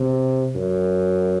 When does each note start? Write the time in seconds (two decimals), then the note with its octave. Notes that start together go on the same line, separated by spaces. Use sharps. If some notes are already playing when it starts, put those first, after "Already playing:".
Already playing: C3
0.55 F#2